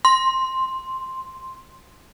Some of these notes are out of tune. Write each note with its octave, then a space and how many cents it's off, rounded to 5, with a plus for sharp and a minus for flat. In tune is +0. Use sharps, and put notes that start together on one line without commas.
C6 +5